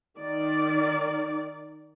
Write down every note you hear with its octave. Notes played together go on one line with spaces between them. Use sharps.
D#3 D5